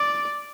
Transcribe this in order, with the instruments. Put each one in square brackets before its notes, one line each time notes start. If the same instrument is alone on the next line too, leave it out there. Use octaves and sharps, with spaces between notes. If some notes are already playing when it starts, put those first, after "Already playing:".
Already playing: [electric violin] D5